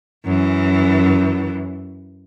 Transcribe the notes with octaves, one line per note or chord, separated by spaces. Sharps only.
F#2 E3